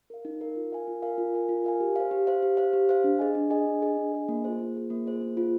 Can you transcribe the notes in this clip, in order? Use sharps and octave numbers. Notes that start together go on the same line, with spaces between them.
A#4 F5
D#4
A#4 F5
F4
A#4 F5 G#5
F4
A#4 F5 G#5
F4
A#4 F5 G#5
F4
A#4 F5 G#5
G4
C5 F5
G4
C5 F5
G4
C5 F5
G4
C5 F5
D4
G#4 D#5 G#5
D4
G#4 D#5 G#5
D4
G#4 D#5 G#5
D4
G#4 D#5 G#5
A#3
F4 G#4 C5
A#3
F4 G#4 C5
A#3
F4 G#4 C5
A#3
F4 G#4 C5